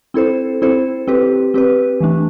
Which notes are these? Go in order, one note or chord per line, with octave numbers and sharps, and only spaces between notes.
C4 E4 A4 C5
C4 E4 A4 C5
C4 G4 B4
C4 G4 B4
E3 A3 D4